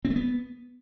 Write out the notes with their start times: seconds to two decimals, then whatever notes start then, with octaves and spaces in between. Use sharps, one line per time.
0.05 C4
0.10 A3
0.16 B3